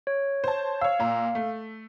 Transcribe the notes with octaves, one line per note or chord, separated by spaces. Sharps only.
C#5
C5 A5
C#5 F5 E6
A#2 A#5
A3